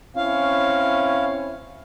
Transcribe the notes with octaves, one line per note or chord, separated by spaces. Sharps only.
C4 C#4 E4 F5